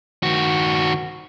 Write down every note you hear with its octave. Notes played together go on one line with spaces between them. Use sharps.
D#3 F#4